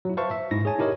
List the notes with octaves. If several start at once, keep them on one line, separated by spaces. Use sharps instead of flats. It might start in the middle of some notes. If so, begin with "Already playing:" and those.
F#3 E4
B4 C5 E5 F5 A5 C#6
E5
G#2 D#4 E4 A#6
G#4 C#5 G#5 A5
D#4 E4 G4 A#4 C#5 D#5